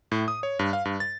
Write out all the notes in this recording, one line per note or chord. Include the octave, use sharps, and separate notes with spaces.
A2
D#6
C#5
G2
F5
G2
A6